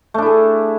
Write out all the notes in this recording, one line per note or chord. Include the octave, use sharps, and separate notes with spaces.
A3 D4 E4 G#4